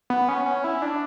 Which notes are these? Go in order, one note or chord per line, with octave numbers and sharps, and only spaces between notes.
B3
C#4
C#4
E4
D4